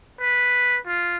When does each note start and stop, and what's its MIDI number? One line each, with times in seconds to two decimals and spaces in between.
0.20 0.79 71
0.87 1.17 65